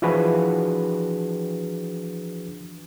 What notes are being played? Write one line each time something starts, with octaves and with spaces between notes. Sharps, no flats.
E3 F3 D4 F#4 G#4 B4